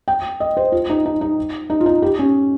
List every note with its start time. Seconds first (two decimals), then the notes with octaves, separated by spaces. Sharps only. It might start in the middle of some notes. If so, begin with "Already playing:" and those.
0.08 G5
0.40 D#5
0.57 C5
0.72 F4
0.90 D#4
1.05 D#4
1.21 D#4
1.70 D#4
1.81 F4
1.86 D#4
2.02 G4
2.19 C#4